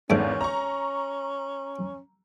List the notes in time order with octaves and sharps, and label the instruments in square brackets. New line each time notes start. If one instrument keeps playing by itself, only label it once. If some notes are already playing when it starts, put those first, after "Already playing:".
[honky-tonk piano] G#1 E2 [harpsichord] G#2 A3 D4 [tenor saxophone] C#4
[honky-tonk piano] A#5 C#6